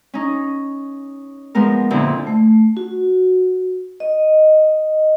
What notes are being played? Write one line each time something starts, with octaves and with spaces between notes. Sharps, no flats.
C#4 D#4
F3 G#3 B3 A#4
F2 A#2 D3 E4
A3
F#4
D#5